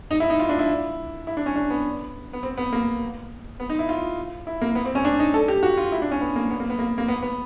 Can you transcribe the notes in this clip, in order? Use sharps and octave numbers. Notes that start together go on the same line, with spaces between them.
D#4
E4
D#4
F4
D4
E4
E4
D4
C#4
D4
B3
B3
C4
B3
A#3
B3
D#4
E4
F4
E4
A#3
B3
C4
C#4
D4
D#4
A4
G4
F#4
F4
E4
D4
C#4
B3
A#3
B3
A#3
B3
A#3
A#3
B3
B3